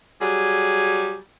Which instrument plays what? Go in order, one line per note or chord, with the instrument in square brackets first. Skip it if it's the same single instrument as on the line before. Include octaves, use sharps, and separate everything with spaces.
[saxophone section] F#3 G3 G#4